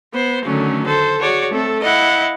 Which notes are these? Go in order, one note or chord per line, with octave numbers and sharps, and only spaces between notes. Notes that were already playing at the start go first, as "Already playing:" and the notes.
B3 C5
D3 D#3 F#3 A3 C#4
A4 C5
F#4 G#4 C#5 D5
A3 C4 A4
E4 D#5 F5 F#5